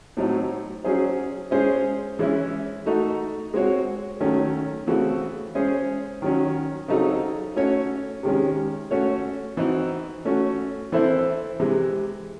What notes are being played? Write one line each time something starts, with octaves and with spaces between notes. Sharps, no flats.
A2 F#3 C4 D#4
F#3 C#4 G#4 C5
G#3 C#4 G#4 C5
E3 G#3 C#4 E4
A3 D#4 F#4 A4
G#3 C4 F#4 C#5
D#3 F#3 A3 C#4
C#3 E3 A3 C4 F#4
G#3 C#4 G#4 C5
D#3 F#3 C#4
C#3 F#3 C4 D#4 A4
A3 C#4 F#4 C#5
C3 D#3 G#3 C#4
A3 C#4 F#4 C#5
E3 C4 D#4 F#4
A3 C#4 F#4
E3 C4 E4 A4 C5
C3 E3 G#3